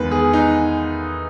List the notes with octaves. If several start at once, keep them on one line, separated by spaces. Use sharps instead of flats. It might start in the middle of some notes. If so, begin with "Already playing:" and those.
Already playing: E2 D#3 G#3 B3 B4
G#4
D#4